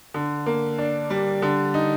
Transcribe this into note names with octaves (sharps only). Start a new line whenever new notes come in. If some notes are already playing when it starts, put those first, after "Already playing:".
D3
A#3
D4
G3
D3
D#4